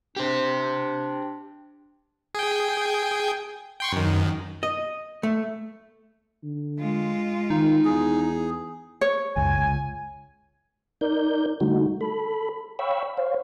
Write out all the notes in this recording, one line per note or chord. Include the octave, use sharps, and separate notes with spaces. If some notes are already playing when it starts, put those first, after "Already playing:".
D4 G4 C5
G#4 G5
G5 C6 C#6
F#2 D#3
D#5
A3
D3
G#3 F4
D#3 D#4
E2 G#4
C#5
F#1 C#2 G#5
C#2
D#4 A#4 D5 G6
D3 G3 A3 D#4 F#4
A4 B5
C#5 F5 G5 B5 C#6 E6
C5 C#5 F5